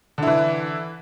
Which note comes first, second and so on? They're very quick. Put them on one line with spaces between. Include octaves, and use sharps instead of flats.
D3 E4 E3